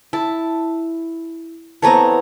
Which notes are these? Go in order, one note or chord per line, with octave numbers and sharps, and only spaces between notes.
E4 A5
E3 B3 C4 A4 C#5 A#5